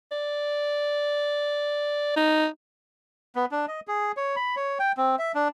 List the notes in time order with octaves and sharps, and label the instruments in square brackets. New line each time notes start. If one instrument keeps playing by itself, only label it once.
[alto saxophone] D5
D#4
[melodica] B3
D4
D#5
G#4
C#5
B5
C#5
G5
C4
E5
D4